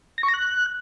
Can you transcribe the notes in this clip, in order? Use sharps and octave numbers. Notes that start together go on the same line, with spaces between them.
A#6
C#6
A#6
F#6